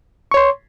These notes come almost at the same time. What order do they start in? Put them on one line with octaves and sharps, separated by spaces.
C#6 C#5 C6